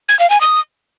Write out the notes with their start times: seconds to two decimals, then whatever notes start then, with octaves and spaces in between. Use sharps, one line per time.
0.09 G#6
0.19 F5
0.30 G#5
0.41 D#6